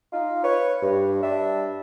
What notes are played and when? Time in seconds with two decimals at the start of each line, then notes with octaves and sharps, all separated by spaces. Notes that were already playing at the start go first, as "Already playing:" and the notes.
0.12 D#4 F4
0.44 B4 C#5
0.82 G2
1.23 G3 D4 E5